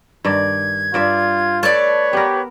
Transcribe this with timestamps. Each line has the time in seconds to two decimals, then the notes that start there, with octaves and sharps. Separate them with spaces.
0.25 G2 D#3 D5 G#6
0.94 G2 F4 D5 E5
1.63 A3 B4 C#5 D5 A5
2.13 B3 G4 A#4